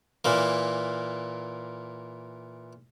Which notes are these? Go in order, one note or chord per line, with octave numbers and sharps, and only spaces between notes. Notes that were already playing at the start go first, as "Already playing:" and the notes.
A#2 E3 A#3